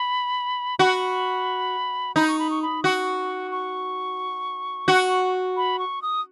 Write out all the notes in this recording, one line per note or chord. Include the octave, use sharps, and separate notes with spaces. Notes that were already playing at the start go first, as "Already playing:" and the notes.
Already playing: B5
F#4 B5
D#4 B5
C#6
B5
C#6
B5
F#4 C#6
C#6
F#4
B5
C#6
D#6